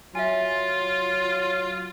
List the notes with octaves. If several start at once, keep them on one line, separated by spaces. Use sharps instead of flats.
F#3 F4 E5 G#5